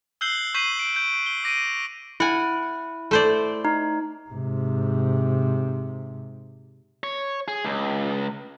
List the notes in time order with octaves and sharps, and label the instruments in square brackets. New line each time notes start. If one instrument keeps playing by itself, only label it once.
[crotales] E6 F#6 G6 C7 F#7 G7
C#6 G6 B6 C7 D#7 F#7
D7
G6 D7
G7
D6 A#6 D7 D#7
[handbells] E4 [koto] F#5 G#5
[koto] A3 C5 D5
[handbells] D#4
[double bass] G#2 C3
[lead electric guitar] C#5
G#4
C#2